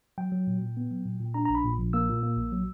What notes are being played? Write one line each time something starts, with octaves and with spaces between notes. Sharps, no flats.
F#3 G5
F#3
A#2
A#2
B3
F#3
A#2
A#2
D4 A#5
A#5
A#1
B5
A#2
A#1
A#3 E6
A#2
A#3
A#1
F#3